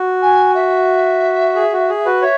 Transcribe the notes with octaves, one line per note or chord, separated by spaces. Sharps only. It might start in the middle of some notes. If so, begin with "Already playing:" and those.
Already playing: F#4
G#5
E5
G#4
F#4
G#4
F#4 B4
C#5 E5